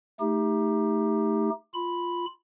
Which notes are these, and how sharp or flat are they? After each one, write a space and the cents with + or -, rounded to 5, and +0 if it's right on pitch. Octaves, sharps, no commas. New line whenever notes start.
A3 +0 D#4 +15 G4 +20
F4 +0 B5 +0